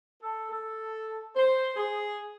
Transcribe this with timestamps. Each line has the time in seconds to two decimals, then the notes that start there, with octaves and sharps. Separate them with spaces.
0.21 A4
0.51 A4
1.35 C5
1.76 G#4